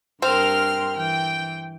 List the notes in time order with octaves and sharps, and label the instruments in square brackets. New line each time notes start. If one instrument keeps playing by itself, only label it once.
[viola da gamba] G2 A#4 [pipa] C4 [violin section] C6 F6
[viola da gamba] E3 [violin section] G5